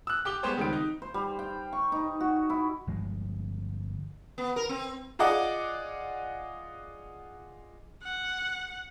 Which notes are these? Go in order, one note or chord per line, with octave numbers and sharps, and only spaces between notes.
E6 F#6
G4 D6 G7
G3 G#3 B3 G4 C5 C#5
C#2 D#3 G3 C4 D7
D#4
C5
G3
G5
C#6
D#4
F#4
E4
G1 F3 G#3
B3
A#4
C4
F4 G#4 D5 D#5 F#5 D6
F#5